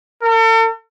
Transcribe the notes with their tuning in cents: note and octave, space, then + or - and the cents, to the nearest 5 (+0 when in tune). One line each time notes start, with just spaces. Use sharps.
A4 +45